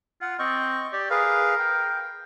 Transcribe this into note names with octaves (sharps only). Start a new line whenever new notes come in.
F4 F#5
C4 D#5 C#6
G4 D5
G#4 A#4 B4 F5
G5